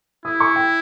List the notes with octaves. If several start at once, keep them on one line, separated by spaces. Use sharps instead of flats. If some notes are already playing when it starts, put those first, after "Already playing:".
E4 D#6
C#6
G5